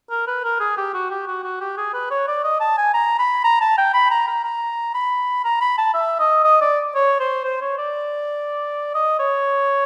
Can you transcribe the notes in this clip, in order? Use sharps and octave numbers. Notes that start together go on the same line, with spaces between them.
A#4
B4
A#4
G#4
G4
F#4
G4
F#4
F#4
G4
G#4
B4
C#5
D5
D#5
A5
G#5
A#5
B5
A#5
A5
G5
B5
A#5
A#5
A#5
B5
A#5
B5
A5
E5
D#5
D#5
D5
C#5
C5
C5
C#5
D5
D#5
C#5